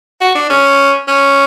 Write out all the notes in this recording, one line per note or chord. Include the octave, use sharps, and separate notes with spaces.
F#4
D4
C#4
C#4